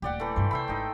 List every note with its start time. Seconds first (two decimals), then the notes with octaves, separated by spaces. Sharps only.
0.02 D#1 D2 G4 D5 F#5
0.20 E3 A3
0.36 E1 G2 C5
0.51 B1 C3 C5 E5 B5
0.68 G#1 D#4 E4 G5